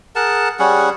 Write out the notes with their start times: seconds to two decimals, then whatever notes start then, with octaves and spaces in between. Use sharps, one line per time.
0.15 G#4 A#4 F#5 A5
0.59 G3 C#4 G#4 F#5